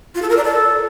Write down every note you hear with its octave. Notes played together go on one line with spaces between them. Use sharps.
F4
A4
A#4
D5
A4